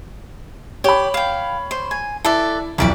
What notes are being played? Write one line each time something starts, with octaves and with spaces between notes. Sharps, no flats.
G4 C#5 B5
F5 G5
C5
G#5
E4 A4 B4 D5
B1 F2 E3 B4 D5 B5